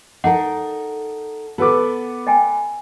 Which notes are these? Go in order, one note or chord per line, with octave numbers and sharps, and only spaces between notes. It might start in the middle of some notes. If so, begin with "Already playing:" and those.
D#4 A4 A#4 F#5
B3 A4 B4 D6
D#5 G5 G#5